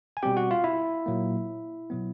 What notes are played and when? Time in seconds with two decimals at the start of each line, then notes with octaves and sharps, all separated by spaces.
0.17 G#5
0.23 B2 G3 C4 G4 G5
0.37 F#4 F#5
0.51 F4 F5
0.64 E4 E5
1.06 A#2 F#3 A#3
1.90 B2 F#3 B3